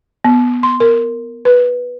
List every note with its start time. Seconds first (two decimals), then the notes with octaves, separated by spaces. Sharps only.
0.24 B3
0.63 C6
0.80 A#4
1.45 B4